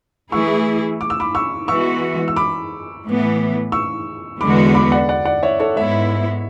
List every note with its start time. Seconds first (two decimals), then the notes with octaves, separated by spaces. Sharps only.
0.32 E3 A3 E4 G#4 C#6 E6
1.01 D6
1.10 E6
1.20 B5 D6
1.35 C#6 E6
1.68 E3 G#3 B3 F#4 C#6 E6
2.28 E6
2.36 B5 D6
3.04 A2 E3 B3
3.72 C#6 E6
4.41 E2 D3 G#3 B3 F#4 B5 D6
4.74 B5 D6
4.92 D5 F#5
5.09 D5 F#5
5.25 D5 F#5
5.43 C#5 E5
5.60 A4 C#5
5.76 G#2 G#3 B3 E4 C#5 E5